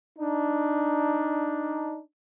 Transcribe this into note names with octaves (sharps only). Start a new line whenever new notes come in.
D4 D#4